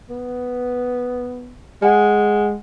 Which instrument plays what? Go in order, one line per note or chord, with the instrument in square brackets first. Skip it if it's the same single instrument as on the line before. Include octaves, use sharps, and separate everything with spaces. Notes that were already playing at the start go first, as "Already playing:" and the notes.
[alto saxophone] B3
[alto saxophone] G#3 [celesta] F#5 G#5